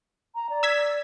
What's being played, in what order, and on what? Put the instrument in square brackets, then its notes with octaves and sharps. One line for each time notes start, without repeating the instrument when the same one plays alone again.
[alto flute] A#5
D5
[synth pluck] E6 G#6 B6